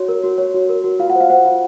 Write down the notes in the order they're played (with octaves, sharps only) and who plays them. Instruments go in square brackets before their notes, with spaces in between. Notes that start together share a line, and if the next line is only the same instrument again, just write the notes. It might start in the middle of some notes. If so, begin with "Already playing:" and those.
Already playing: [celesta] F#4 C#5
A#4
F#4
C#5
F#4
A#4
F#4
F4 F5
F#5
C5 F5
C5 F#5
F4